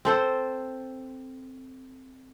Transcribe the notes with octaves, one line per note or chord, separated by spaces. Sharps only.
C4 A4 C5